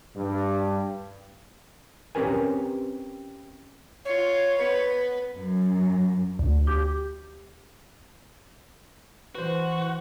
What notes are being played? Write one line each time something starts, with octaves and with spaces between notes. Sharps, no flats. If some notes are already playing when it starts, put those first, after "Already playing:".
G2
C4 C#4 G4 A#4 B4 G#5
F4 C#5
B3 B4
F#2
D2
G4
E3 F#4 B4 C5